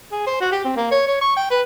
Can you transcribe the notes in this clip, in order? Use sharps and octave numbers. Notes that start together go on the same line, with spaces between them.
G#4
C5
F#4
G4
C4
A#3
C#5
C#5
C#6
G5
B4